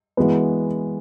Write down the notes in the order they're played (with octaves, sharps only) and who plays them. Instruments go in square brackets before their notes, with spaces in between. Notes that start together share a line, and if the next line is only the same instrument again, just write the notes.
[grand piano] E3 G#3 B3 F#4 B4